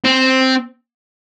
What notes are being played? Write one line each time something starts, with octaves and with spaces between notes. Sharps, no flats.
C4